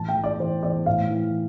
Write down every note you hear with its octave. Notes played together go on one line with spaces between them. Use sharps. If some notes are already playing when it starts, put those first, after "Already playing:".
Already playing: A2 E3 A5
G5
E3
D5
E3 C5
E3 D5
A2 F5
E3